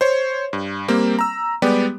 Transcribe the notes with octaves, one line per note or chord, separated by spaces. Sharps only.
C5 C#5
G2
G3 A#3 C4
A#5 E6
G3 G#3 B3 G4 D5